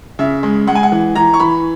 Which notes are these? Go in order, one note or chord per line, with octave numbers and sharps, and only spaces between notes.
C#3 E5
G#3
G#3 F#5
G#5
F#5
E3
E3 A#5
C#6
E3 B5